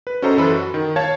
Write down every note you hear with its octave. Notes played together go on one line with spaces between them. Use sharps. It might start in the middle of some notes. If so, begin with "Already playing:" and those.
B4
C#4 F#4 A4 C5 D#5 A#5
F#2 E3 A4 B4 B5
F#4
D#3
C#5 F5 A5 G#6